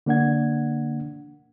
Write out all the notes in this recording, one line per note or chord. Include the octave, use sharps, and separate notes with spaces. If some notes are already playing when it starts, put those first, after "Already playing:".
D3 A#3 D4 F#5 G#6